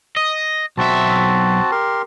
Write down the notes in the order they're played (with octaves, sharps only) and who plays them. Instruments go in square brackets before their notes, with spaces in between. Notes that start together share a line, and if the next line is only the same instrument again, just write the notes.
[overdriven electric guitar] D#5
[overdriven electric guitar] B1 E5 [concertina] C4 F#4 A5
[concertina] G4 A#4 C6